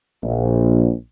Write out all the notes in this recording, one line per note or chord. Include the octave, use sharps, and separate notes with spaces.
A#1